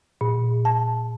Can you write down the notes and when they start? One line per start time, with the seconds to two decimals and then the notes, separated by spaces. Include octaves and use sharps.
0.21 A#2
0.65 A5